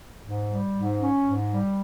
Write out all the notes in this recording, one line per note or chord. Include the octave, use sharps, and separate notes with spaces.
G#2
G3
G#2
C#4
G#2
G3